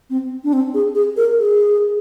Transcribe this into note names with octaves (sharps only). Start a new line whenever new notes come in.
C4
D4
C4
G#4
G#4
A#4
G#4